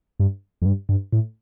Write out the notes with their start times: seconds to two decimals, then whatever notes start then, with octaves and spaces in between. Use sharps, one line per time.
0.19 G2
0.62 F2
0.65 G2
0.89 G2
1.13 A2